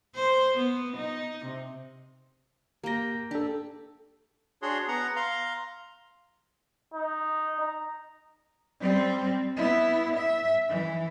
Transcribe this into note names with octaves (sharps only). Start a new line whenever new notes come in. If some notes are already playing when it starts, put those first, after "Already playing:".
C5
B3
D#4
C3
A#3 G4 G5 A#6
D4 G4 A4
D4 F#4 G#4 C#5 C6
B3 F#5 A#5
F5 A#5 C6
D#4
A#5
G3 C4
B3 E4
E5
E3